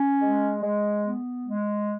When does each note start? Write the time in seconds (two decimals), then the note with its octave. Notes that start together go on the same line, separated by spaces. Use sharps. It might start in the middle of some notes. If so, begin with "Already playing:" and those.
Already playing: C#4
0.22 G#3
0.63 G#3
1.05 B3
1.46 G#3